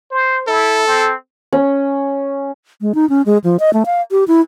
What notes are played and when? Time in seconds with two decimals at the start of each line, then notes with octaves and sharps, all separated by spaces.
0.11 C5
0.48 E4 A4
0.87 C4
1.53 C#4
2.81 G#3
2.95 D#4
3.09 C#4
3.26 G#3
3.44 F3
3.60 D#5
3.74 A3
3.86 F5
4.11 G4
4.28 E4